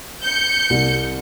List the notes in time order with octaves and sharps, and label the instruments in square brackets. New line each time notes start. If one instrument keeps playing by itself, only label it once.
[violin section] G6 C#7
[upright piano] C2